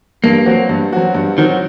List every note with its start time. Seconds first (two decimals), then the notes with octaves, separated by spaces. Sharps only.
0.24 G2 A#3
0.46 F#3 C4 F#4
0.69 G2
0.93 F#3 C4 F#4
1.15 G2
1.38 D#3 F#3 C4 F#4